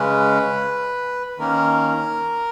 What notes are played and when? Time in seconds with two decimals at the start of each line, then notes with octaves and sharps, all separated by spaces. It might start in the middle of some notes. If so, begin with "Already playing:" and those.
Already playing: C#3 G#3 C#4 B4
1.38 D#3 A#3 C#4 A#4